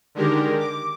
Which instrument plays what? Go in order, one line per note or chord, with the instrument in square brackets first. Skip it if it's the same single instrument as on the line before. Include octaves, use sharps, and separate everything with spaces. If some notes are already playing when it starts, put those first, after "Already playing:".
[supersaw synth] D3 D#3 G#3 G4 A#4
D6